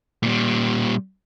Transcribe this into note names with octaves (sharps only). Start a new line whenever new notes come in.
A#2 G3